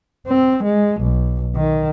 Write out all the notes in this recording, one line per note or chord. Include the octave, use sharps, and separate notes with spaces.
C4
G#3
B1
D#3